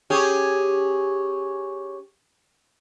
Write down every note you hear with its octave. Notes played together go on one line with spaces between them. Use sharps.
C#4 G4 G#4